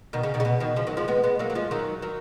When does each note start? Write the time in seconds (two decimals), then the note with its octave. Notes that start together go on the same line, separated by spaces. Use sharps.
0.13 B2 D#3
0.23 C#3
0.34 B2 D#3
0.40 C#3
0.45 B2
0.60 B2 D#3
0.76 C#3 F3
0.87 D#3 F#3
0.97 F3 G#3
1.08 G#3 B3
1.23 G#3 B3
1.39 F#3 A#3
1.50 F#3
1.55 F3 G#3
1.71 D#3 F#3
2.02 D#3 F#3